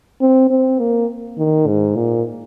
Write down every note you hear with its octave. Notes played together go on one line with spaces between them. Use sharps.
C4
C4
A#3
D#3
G#2
A#2